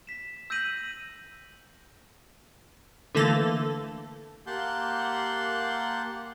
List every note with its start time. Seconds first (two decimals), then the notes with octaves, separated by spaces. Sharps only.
0.07 B6 E7
0.50 E6 G6 A#6 B6 D#7 F#7
3.15 D3 E3 A3 A#3 A4
4.47 A#3 G4 F#5 A5 C6 G6